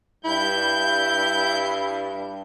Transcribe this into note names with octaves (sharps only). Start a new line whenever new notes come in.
G2 E4 G6